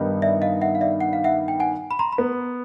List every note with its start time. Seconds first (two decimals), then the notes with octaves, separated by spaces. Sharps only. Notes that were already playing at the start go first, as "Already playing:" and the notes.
Already playing: G2 D#3 G3 B3 D#4
0.22 D5 E5
0.42 D#5 F5
0.61 E5 F#5
0.75 F5
0.81 D5 E5
1.01 F#5
1.13 F5
1.24 E5 F#5
1.48 G5
1.60 F#5 G#5
1.91 B5
1.99 A#5 C6
2.12 B5
2.18 B3